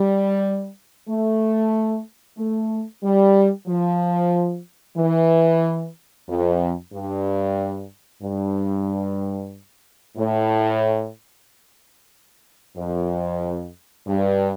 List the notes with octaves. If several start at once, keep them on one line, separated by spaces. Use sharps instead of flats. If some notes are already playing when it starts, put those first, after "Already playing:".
Already playing: G3
A3
A3
G3
F3
E3
F2
G2
G2
A2
F2
G2